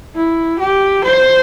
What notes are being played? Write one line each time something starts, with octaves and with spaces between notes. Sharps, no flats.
E4
G4
C5